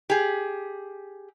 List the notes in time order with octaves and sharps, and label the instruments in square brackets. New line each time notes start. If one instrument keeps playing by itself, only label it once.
[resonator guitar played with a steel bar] G4 G#4